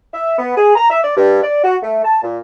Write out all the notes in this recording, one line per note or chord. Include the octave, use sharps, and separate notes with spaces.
E5
B3
G#4
A#5
E5
D5
G2
D5
F#4
A3
A5
A#2